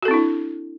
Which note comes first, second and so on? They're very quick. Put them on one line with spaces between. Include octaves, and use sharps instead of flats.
F#4 A4 C4 E4 D4